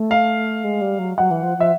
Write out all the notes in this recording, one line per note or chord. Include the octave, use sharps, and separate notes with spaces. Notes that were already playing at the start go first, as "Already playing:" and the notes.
Already playing: A3
F5
G#3
G3
F#3
F#3 F#5
E3
F3
F3 E5